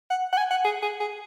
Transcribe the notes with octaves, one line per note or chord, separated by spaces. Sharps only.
F#5
F#5
G#5
F#5
G#4
G#4
G#4